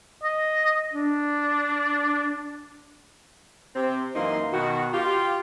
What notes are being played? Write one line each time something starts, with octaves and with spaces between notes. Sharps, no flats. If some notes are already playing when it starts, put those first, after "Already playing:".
D#5
D4
C3 C4
F#2 E3 A#3 D#4 C6
B2 D#3 F#4
F4 G4